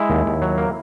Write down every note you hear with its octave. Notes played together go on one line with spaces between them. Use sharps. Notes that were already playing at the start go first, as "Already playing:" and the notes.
Already playing: G#3 E4
D#2
D#2
F#3
A#3